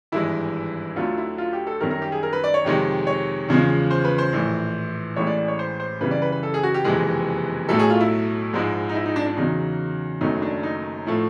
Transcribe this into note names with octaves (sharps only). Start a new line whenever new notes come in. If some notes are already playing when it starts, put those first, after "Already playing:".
G#1 G2 E3 G#3 E4
D2 D3 F#3 A3 F4
E4
F4
G4
A4
F#2 D#3 G3 A#4
A#4
G4
G#4
A#4
B4
D5
C#5
F2 C3 D#3 G#3
C#5
E2 C#3 F3 G#3
C5
B4
C5
A#1 A2 E3
A1 A2 E3 G#3 C#5
D5
D5
C#5
C5
C5
F#2 C#3 E3 G3 B4
D5
B4
B4
A4
G#4
F#4
G4
F#1 F2 C3 E3 G#3 G#4
B1 A2 F#3 A3 A4
G#4
F4
E4
A#1 G#2 F3 G#3
D#4
E4
D#4
D4
D4
E2 C#3 F#3 D#4
F#1 F#2 D#3 F#3 A3 D#4
D4
D#4
A2 F3 A3